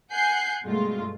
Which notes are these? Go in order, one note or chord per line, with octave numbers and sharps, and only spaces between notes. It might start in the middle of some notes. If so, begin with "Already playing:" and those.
F#5 G#5 F#6 G6 C7
G2 B2 G#3 A3 F4